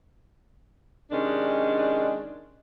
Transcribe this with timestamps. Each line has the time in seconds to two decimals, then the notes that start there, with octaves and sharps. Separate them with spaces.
1.11 C3 D#3 G#3 C#4 D4